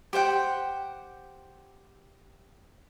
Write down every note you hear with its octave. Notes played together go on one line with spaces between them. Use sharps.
G4 C5 F#5 G5